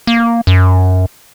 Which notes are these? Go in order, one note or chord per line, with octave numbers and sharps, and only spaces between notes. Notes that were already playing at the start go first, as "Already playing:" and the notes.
A#3
F#2